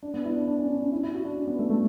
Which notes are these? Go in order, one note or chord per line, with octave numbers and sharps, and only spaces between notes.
D4
B3
E4
D4
D4
C#4
D4
D4
E4
E4
F#4
D4
C#4
B3
A3
A3